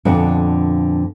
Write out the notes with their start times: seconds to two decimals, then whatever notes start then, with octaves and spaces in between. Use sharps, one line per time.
0.05 F2 A#2 D3 B3 D4